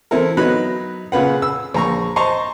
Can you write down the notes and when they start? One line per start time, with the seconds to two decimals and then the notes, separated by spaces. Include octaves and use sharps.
0.11 E3 C4 E4 A4 A#4
0.37 F#3 B3 D#4 B5 F#6
1.12 A#2 C#3 B4 F#5
1.42 E6
1.74 A#1 A#5 C#6
2.16 C5 D#5 A5 A#5 C6 C#6